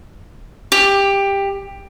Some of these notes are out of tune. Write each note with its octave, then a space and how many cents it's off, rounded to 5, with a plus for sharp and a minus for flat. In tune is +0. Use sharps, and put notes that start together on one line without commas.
G4 +15 D6 +0